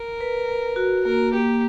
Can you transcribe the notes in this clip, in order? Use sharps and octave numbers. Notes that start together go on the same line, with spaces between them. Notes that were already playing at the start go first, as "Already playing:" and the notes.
Already playing: A#4
B4
B4
F#4
A#3 A#4
A#3 G4